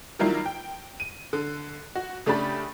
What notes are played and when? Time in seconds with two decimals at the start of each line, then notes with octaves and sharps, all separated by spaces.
0.19 D#3 F#3 G3 A#3 E4 F4
0.46 G5
1.00 D#7
1.33 D3
1.95 F#4
2.26 C#3 A3 D4 G4 B5 A6